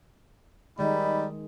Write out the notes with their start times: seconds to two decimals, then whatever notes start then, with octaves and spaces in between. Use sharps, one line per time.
0.79 D#3 G3 G#3 D#4 B5